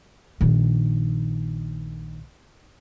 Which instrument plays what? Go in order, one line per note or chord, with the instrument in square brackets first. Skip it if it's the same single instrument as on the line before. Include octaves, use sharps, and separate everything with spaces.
[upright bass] A#1 D#3